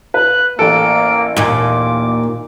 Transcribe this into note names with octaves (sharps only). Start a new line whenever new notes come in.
B4 F#6
A1 A#3 A4 D7
D#2 A#2 F4 D6